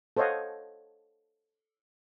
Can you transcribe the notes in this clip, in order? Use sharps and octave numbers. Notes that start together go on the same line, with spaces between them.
A4 C5 C#5 D#5 F5 F#5